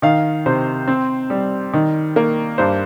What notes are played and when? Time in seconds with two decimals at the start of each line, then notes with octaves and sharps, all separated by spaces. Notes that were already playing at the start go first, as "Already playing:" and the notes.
0.02 D#3 F5
0.46 C3 C5
0.88 C4
1.30 G3
1.73 D#3
2.16 A#3
2.58 G2 C5